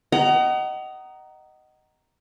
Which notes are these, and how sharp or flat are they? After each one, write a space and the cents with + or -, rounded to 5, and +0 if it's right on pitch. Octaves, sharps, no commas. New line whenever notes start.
D#5 +0 F#5 +35 A#5 +0